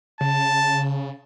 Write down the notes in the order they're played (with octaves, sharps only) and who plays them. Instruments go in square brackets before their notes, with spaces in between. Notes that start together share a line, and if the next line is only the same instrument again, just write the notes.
[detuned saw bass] C#3 [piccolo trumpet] A5